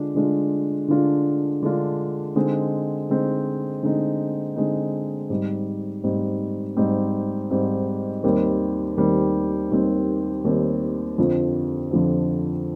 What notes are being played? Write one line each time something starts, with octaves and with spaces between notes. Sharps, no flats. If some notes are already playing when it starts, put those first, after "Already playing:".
Already playing: D3 G#3 D4 F4
D3 G#3 D4 F4
D3 G#3 D4 F4
D3 G#3 D4 F4
D3 G#3 C4 D#4
D3 G#3 C4 D#4
D3 G#3 C4 D#4
D3 G#3 C4 D#4
G#2 G3 C4 D#4
G#2 G3 C4 D#4
G#2 G3 C4 D#4
G#2 G3 C4 D#4
D#2 D#3 G3 C4
D#2 D#3 G3 C4
D#2 D#3 G3 C4
D#2 D#3 G3 C4
F2 D3 F3 C4
F2 D3 F3 C4